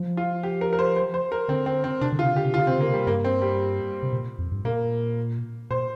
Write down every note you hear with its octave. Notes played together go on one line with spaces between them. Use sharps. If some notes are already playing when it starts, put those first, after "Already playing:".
Already playing: F3
F4
G4
A#4
A#4
C5
C5
C5
A#4
D3 C4
C4
C4
C3 D4
D3
F4
C3
D3 G4
C3
D3 F4
C3 C4
D3 A#3
C3
G3
G2 A#3
C4
G3
C3
A#2
F2
G2
A#2 A#3
A#2 C5